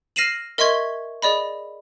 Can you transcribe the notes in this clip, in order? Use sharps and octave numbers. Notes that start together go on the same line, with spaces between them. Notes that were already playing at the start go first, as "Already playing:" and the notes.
F6 A#6 C7 D#7 E7 F#7
A#4 D#5 E5 C6 C#6 G#6
G#4 D5 D#5 B5